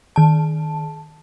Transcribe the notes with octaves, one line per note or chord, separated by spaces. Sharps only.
D#3 A5